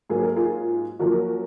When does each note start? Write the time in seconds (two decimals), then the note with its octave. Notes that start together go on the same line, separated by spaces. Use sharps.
0.10 G#2 F#3 A#3 G#4
0.23 A#4
0.36 F4 G#4
0.99 F#2 F3 A#3 F#4 A#4